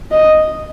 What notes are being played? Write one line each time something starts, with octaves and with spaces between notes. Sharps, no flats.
D#5